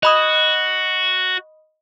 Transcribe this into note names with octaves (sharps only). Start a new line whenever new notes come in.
F#4 D#5 B5 D#6